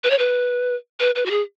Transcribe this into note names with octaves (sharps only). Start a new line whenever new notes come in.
B4
C#5
B4
B4
B4
F#4
G#4